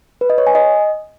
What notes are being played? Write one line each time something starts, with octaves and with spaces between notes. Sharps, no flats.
B4
D#5
C#5
G#5
D#5